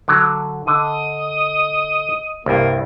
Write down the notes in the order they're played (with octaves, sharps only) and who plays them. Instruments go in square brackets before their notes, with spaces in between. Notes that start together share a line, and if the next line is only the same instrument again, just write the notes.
[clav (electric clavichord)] D3 F#3
[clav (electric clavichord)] D3 [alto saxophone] D#5
[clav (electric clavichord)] C2 G2 [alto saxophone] A#3